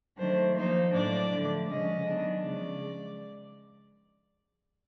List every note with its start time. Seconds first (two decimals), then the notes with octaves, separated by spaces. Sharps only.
0.17 D#3 F#3 A3 D4 C5
0.54 F3 A#3 D#4 C5
0.92 A2 F#3 A#3 D4 D5
1.31 D3 F3 A3
1.68 C#3 F3 G#3 C#4 D#5
2.06 D#3 F#3 B3 D4
2.43 C#3 F3 G#3 D5